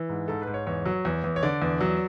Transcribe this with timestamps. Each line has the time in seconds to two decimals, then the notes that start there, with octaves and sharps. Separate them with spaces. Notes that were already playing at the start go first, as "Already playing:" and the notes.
Already playing: E3
0.09 G#2
0.28 G#2 A4
0.42 B4
0.47 G#2
0.54 C#5
0.67 E2 C#5
0.85 F#3
1.05 E2
1.24 E2
1.36 C#5
1.43 D3 D5
1.62 E2
1.81 F#3